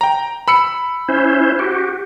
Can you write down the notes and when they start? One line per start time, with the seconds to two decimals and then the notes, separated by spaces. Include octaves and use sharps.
0.01 G5 A#5
0.48 B5 E6 C#7
1.09 C#4 E4 C5
1.59 F#4 G4